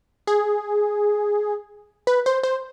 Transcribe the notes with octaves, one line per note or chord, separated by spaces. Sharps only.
G#4
B4
C5
C5